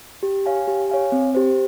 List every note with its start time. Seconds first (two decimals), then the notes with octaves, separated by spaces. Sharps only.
0.23 G4
0.46 C#5 F5 G#5
0.68 G4
0.90 C#5 F5 G#5
1.12 C4
1.35 G4 C5